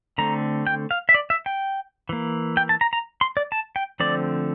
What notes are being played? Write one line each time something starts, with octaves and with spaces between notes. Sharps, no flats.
D3 A3 C4 A#5
G5
F5
E5
D5
E5
G5
E3 A#3
G5
A5
A#5
A#5
C6
D5
A5
G5
D3 F3 A3 C4 D5